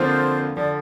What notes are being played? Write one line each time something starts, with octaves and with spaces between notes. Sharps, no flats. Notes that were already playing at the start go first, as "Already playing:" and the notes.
Already playing: F2 D3 F3 A#3 F4 C5
D3 F3 D5